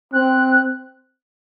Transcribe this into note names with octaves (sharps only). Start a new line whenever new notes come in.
C4 F#6